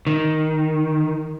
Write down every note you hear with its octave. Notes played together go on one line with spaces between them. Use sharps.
D#3